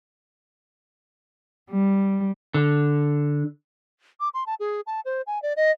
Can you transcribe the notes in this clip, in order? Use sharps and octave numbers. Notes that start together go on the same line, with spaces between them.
G3
D3
D6
C6
A5
G#4
A5
C5
G#5
D5
D#5